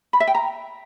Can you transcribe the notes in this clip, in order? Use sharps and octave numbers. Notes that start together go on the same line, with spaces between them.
B5
E5
G5
A#5